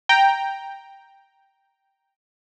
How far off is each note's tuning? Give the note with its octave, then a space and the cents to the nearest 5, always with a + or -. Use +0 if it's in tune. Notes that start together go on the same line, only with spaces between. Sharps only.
G5 +0 A#5 +0